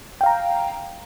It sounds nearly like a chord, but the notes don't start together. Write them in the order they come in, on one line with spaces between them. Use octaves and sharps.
G5 F5 A#5